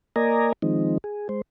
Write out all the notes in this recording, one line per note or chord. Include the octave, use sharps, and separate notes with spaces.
A#3 A#4 D5 D#5 G#5 A#5
D#3 F3 G#3 C4 D#4
G#4
G#3 C5